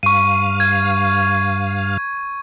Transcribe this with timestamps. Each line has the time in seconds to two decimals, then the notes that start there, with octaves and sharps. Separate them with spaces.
0.03 G2 F5 C#6 D#7
0.60 G#6